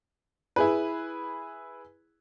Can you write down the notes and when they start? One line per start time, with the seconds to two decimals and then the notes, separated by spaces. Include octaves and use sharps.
0.56 E4 G#4 B4